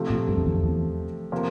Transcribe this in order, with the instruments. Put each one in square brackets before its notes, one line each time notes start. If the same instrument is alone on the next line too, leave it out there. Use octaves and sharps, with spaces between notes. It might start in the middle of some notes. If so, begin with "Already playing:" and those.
Already playing: [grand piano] C3 F3 A3
[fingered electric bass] A#2
G2
F2
E2
F2
E2
[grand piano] C3 F3 A#3